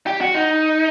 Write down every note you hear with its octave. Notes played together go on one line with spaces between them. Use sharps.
G4
F#4
D#4